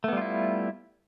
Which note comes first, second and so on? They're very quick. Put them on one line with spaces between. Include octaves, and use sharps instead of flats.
A3 B3 G3 F4 E4